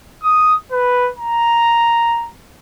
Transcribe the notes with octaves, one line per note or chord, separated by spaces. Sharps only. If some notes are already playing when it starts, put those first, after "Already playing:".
D#6
B4
A#5